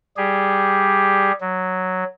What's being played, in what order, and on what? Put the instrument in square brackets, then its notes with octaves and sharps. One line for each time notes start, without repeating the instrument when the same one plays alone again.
[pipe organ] G3 G4 G#4
F#3